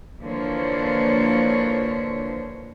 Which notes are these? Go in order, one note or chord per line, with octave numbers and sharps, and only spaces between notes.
D3 E3 F3 A#3 C5 C#5